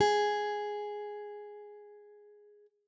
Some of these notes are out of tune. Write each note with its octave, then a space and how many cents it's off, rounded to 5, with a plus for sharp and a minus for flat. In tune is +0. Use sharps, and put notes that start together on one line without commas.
G#4 +0